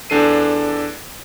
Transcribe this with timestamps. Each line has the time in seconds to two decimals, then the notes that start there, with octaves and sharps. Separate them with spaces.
0.10 E2 D4 A4 C7 D#7